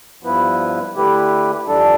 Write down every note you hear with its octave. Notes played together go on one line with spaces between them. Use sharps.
G2 F3 B3 E4 B4
D3 A3 E4 G4 B4
F2 E3 G3 D4 A4